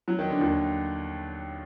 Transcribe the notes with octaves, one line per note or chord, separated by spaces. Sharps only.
F#3
D#3
D3
D#2 D#3